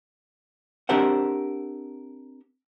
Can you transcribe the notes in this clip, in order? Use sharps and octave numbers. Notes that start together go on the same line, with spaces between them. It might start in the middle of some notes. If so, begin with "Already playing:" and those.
C4 D4 G4 A#4 C5 F#5